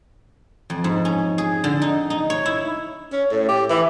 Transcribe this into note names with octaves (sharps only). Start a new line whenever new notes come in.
F2
G#2
C#4
G#4
D3
D#4
D#4
C#5
E4
C#4
A2
G4
E3